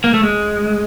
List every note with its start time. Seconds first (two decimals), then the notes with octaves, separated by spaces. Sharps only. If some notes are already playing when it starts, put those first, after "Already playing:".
0.04 A#3
0.14 A3
0.23 G#3